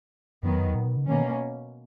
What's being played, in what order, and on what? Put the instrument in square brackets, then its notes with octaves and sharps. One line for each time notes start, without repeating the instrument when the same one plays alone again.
[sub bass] F#2 [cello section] D#3 F#3 B3
[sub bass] E2
F#2
E2
A#2
B2
C#3
[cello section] B2 A#3 C#4 [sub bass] D#3